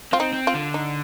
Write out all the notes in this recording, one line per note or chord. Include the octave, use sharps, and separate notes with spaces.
C4 F4
D#4
C4
F4
D3
D#4